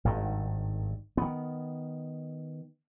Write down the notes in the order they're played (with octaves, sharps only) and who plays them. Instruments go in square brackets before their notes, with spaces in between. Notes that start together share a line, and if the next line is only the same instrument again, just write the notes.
[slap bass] G#1 G2 D#3
D#3 B3